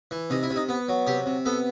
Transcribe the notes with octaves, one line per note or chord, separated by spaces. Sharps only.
E3
C3 D#4
E4
C3
D#4
B3
F#3
C3 G4
C3
B3 A4